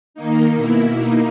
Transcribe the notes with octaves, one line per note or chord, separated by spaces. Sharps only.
D#3 A#3 D#4
B2 A#3 E4
A#3 D#4